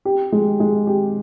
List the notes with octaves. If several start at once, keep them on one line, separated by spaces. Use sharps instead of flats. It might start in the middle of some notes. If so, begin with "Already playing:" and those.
G4
G#3
G#3
G4